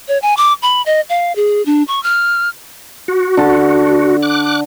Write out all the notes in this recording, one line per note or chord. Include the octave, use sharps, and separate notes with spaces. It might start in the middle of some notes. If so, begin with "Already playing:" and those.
C#5
G#5
D6
B5
D#5
F5
G#4
D4
C#6
F6
F#4
D3 A5
D6 F#6